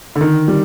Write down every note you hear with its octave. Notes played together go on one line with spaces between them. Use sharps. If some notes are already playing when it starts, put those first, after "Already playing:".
D3
D#3
G3